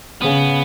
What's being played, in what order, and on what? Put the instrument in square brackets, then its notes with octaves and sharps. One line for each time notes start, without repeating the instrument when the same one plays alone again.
[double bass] C#3 [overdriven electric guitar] B3